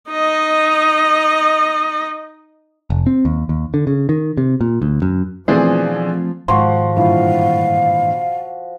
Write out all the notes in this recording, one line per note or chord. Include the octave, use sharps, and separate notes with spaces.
D#4 D#5
F1
C4
D#2
D#2
D3
C#3
D#3
C3
A#2
D2
F#2
B2 E3 F3 A3 C4 D4 G#4 C5
G#2 D#3 F3 F#4 C6
G2 A#2 E3 F5